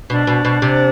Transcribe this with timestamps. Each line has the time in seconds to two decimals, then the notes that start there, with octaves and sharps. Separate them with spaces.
0.10 B2 D4
0.27 B2
0.45 B2
0.62 C3